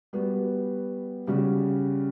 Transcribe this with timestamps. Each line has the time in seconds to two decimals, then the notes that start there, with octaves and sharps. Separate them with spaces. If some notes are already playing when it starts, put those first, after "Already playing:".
0.13 G3 B3 F#4
1.27 C#3 G3 C#4 F#4